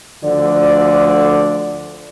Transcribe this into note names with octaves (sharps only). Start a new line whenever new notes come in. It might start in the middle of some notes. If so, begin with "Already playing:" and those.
D2 D3 F3 D5